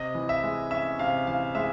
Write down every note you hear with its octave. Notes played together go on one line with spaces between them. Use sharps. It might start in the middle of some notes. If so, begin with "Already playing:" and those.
Already playing: C3 D#5
E3
E5
G#3
C#4 E5
C3 F5
E3 F5
G#3 E5